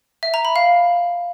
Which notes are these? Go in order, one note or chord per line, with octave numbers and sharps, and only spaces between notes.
E5
A#5
B5
F5